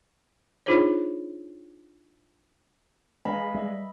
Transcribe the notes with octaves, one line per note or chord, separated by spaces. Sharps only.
D4 D#4 F4 G#4 C5 C#5
G#3 D#5 F5 B5
G3 D#5 E5